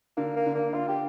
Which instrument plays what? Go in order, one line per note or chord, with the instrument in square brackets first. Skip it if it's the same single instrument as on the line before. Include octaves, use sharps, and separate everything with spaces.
[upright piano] D3 [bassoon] A#3
[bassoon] A#3
[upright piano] D3
[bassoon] A#3
[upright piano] D4 [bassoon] F4
[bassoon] G4